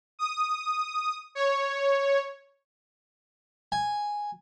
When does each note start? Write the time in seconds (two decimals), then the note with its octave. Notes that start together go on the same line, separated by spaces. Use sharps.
0.19 D#6
1.35 C#5
3.72 G#5